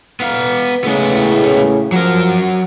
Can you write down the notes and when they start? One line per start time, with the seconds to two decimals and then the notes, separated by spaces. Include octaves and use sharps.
0.20 B3 F5
0.84 A2 C#3 G#3 B3
1.92 F3 F#3 A#4